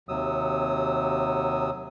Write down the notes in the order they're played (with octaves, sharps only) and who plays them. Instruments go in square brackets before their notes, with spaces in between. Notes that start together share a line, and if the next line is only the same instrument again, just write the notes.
[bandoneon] D#2 C3 F#3 D#6 E6